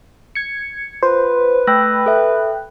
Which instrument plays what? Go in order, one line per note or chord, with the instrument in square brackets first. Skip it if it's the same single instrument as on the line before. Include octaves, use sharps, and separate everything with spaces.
[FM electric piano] G#6 C#7
[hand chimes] F4 [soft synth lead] B4 [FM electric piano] C5
[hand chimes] A3 E6 A#6 [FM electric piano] G5 B5 F#6
[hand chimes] A4 E5